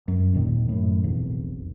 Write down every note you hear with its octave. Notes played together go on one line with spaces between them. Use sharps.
F#2
G#1 D#2 A#2 D#3
F#2 A2
F1 B1 E2